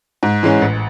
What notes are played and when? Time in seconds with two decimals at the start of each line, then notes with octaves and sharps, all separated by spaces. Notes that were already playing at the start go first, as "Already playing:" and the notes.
0.23 G#2
0.43 E3 G#3 C#4
0.62 A1